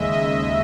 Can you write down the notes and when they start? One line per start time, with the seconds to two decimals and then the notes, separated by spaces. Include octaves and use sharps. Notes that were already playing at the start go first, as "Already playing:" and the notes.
Already playing: D#2 C#3 G#3 D#5 E5
0.12 D#5